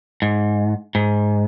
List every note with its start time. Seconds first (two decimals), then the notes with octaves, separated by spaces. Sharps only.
0.22 G#2
0.95 G#2